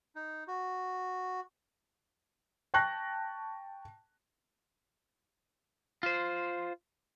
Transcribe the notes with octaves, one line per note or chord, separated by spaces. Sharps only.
D#4
F#4
G5 A5 C#6 F#6 A#6
F4 C5